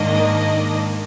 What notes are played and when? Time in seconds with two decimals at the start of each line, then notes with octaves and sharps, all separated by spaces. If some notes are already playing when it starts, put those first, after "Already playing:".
Already playing: G#2 D#3 A#3 D4 D#5